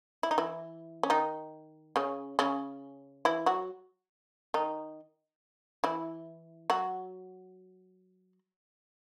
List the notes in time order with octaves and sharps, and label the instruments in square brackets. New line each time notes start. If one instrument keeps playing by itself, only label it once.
[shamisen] E4
D#4
E3 E4
C#4
D#3 D#4
C#3 C#4
C#3 C#4
E3 E4
F#3 F#4
D#3 D#4
E3 E4
F#3 F#4